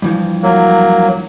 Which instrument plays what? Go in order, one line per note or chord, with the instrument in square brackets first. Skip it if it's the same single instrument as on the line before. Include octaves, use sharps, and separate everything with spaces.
[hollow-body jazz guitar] G2 E3 F3
[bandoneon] F#3 A#3